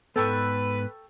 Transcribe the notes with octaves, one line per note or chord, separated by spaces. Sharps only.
G#2 B3 A4 B4 G5 C#6